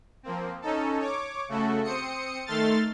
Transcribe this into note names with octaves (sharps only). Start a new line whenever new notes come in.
F3 A#3 C4
C#4 D#4 A4
C#5 D6
C#3 A3 F#4 A4
C4 C5 D#6 C#7
D#3 A3 A4 C6 F6 A6